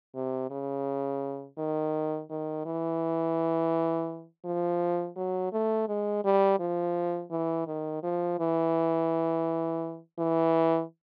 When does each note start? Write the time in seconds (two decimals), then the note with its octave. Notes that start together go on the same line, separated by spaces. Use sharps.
0.15 C3
0.51 C#3
1.58 D#3
2.30 D#3
2.66 E3
4.45 F3
5.16 F#3
5.52 A3
5.88 G#3
6.24 G3
6.60 F3
7.31 E3
7.67 D#3
8.03 F3
8.39 E3
10.19 E3